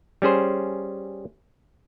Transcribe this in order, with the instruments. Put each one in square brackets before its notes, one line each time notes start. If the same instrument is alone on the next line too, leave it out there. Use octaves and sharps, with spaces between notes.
[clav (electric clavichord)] G3 C#4 G#4 C5